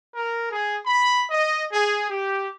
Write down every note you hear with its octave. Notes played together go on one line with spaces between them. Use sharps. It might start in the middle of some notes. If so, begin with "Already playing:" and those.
A#4
G#4
B5
D#5
G#4
G4